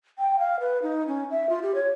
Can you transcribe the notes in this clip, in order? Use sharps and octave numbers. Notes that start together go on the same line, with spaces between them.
G5
F5
B4
D#4
C#4
E5
F4
G4
C#5